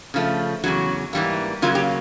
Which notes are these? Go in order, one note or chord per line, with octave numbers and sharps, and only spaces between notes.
C#3 F3 A3
E2 C#3 F#3 F#4
G#2 E3 G3 A#3
C#3 F#3 A#3 F4
G4